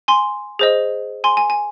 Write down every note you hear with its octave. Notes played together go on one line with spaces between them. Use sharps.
G#5 C6
G#4 C5 D#5
G#5 C6
G#5
G#5